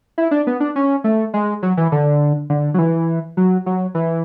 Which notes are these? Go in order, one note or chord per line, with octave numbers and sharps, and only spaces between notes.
E4
D4
B3
D4
C#4
A3
G#3
F#3
E3
D3
D3
F#3
E3
F#3
F#3
E3